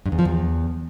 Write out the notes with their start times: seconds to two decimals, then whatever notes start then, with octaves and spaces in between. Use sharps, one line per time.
0.06 G2
0.12 E2
0.19 F3
0.25 E2